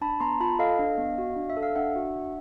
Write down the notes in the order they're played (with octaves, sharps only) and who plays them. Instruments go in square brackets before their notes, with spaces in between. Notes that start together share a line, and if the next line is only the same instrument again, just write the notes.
[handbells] D4 A5 B5
B3 A#5 C6
F4 A5 B5
A4 D#5 F5
D4
B3
F#4
D4
E5
A4
F5
D4 E5 F#5
F#4
D4